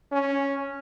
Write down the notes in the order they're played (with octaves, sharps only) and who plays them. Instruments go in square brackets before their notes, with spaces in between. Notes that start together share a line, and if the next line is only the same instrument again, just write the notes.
[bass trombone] C#4